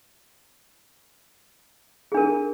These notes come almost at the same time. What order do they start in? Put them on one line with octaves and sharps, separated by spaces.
G#4 D4 A#4